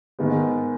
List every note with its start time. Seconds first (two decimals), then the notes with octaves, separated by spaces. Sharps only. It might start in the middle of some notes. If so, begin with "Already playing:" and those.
0.19 G#2 D#3 G#3 B3